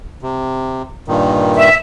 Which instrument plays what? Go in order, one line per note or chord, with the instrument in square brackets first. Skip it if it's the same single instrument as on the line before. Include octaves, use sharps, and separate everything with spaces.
[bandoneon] C3
G2 A#2 D#3
[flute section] E5